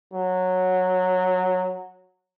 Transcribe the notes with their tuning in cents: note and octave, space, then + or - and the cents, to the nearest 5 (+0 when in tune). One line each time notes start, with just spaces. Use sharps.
F#3 -10